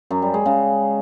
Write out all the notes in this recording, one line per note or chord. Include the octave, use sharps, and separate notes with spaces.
F#2
G3
G#3
C#3